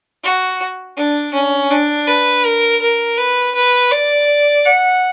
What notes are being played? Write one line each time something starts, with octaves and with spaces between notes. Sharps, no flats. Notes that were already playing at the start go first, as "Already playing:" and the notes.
F#4
D4
C#4
D4
B4
A#4
A#4
B4
B4
D5
F#5